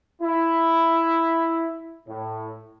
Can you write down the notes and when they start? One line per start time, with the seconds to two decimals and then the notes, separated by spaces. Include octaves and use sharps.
0.22 E4
2.08 A2